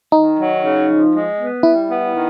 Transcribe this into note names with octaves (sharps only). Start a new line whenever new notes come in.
D#3 D#4
F#3
C#3
F3
G#3
B3
G3 E4
B3
D#3